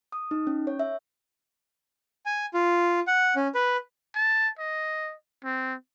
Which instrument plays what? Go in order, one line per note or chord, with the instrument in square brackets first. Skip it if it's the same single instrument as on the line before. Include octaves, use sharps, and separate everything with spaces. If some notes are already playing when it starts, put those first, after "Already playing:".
[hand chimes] D#6
D#4
C#4
C#5
E5
[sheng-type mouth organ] G#5
F4
F#5
C#4
B4
[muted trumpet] A5
D#5
C4